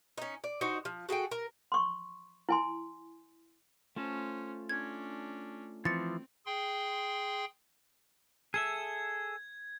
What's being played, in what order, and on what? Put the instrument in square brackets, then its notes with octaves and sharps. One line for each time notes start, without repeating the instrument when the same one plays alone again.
[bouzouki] C#4 D#4
D5
D#4 F#4 C5
F3
F#4 G#4 A4 G5
A#4
[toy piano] C6 C#6
E4 G#5 C6
[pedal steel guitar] A3 F4 A5 [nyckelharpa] C#4 C5
[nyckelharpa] C#4 D4 [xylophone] G#6
[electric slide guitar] E3 F3 [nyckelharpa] C4 [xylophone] A6 C#7
[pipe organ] G#4 G5 C6
[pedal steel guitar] G#4 A4 E5 [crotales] G#6